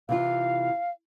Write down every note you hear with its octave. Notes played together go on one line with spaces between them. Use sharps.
C3 E3 F4 F5